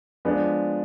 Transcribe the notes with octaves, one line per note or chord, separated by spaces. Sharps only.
F3 G#3 B3 D4